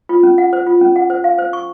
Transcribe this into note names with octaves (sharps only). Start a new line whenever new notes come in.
F4
C#4
F#5
C5
F4
C#4
F#5
C5
F5
C5
C#6